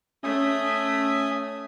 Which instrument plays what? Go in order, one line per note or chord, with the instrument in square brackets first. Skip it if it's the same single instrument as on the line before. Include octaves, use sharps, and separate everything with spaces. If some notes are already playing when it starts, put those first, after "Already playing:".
[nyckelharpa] A3 [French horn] C#4 [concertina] E5 G#5 D#6
[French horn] C#4